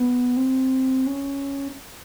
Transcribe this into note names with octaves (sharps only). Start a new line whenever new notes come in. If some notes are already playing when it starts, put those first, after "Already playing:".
Already playing: B3
C4
C#4